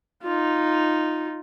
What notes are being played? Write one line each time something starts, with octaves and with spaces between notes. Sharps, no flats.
D#4 F4